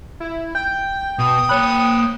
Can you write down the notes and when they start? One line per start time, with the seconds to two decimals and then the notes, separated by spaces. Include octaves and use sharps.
0.20 E4
0.55 G5 G6
1.19 B2 D#6
1.49 A#3 C#5 B5 F#6